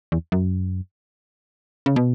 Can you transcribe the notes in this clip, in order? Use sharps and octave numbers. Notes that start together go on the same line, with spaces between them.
E2
F#2
C#3
B2